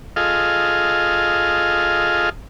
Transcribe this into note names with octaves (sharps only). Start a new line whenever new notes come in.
F4 G#4 A4 D#5 F5